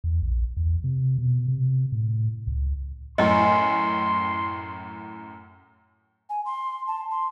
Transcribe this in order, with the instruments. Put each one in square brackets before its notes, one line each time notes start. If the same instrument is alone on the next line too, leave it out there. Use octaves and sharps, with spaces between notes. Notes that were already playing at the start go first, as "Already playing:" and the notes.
[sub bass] E2
A#1
E2
C3
B2
C3
A2
C#2
[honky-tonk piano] F#2 A2 [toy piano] D#5 [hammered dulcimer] G#5 [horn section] C6
[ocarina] G#5
C6
A5
C6